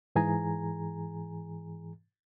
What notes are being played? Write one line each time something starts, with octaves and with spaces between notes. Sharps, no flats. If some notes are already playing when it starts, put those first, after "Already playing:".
G#2 E3 G#4 G#5 A#5